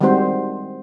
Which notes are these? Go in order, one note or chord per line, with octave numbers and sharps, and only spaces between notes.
D#3 G3 G#3 C4 F#4 C5